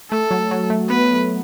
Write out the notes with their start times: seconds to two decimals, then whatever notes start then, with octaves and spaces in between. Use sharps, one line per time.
0.11 A3 A4
0.31 F#3
0.51 F#3
0.70 A3
0.89 B3 B4